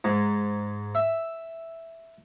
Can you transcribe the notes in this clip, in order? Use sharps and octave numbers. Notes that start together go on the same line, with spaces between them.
G#2
E5